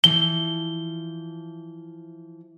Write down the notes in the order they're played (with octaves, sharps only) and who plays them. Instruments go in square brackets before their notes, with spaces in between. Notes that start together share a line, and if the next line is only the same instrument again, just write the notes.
[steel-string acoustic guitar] E3 F3 [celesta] G7